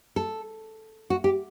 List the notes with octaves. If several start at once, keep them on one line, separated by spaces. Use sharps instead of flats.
A4
F#4
G4